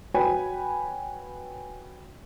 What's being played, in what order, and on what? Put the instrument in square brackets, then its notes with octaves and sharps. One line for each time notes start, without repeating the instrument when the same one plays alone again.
[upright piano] F#4 B4 C#5 G5 G#5 B5